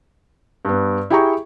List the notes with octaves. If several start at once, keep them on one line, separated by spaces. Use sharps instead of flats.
G2 B3
E4 G4 G#4 G5 A#5 C#6